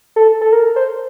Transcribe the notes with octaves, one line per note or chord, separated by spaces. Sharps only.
A4
A4
A#4
C5